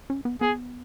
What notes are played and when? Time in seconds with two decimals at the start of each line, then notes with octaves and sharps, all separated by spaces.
0.10 C#4
0.25 B3
0.41 B3 G#4